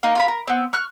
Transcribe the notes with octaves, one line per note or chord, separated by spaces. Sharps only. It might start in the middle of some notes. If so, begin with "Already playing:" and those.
A#3 D#4
F4 A#4 B5
A#4
B3 C4
C#6 F6 F#6